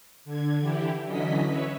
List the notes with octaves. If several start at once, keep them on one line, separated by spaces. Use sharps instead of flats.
D3 G#6
D3 E3 E4 G4
D3 E3 F#3 C#4 D#5 B6
B4 C#5 E5